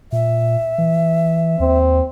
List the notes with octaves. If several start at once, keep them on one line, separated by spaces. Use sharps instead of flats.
A#2 E5
E3
D#2 C4